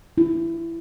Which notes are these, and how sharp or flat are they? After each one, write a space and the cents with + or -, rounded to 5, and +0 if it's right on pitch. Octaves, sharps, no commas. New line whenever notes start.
E4 +15